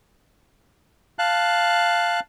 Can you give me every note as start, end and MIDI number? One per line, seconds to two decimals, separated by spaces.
1.19 2.20 77
1.19 2.20 81
1.19 2.20 90